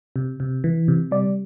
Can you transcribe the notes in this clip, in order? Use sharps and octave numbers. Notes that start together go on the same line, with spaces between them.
C3
C3
E3
C3
G3 D5